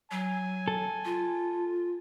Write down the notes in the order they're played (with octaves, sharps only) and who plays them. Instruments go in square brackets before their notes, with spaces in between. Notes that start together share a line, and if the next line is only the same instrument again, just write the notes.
[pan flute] F#3 [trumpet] G#5
[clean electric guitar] A4
[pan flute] F4